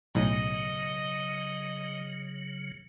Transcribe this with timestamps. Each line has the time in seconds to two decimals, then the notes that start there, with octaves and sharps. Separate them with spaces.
0.15 B1 A2 C#3 F#3 D#5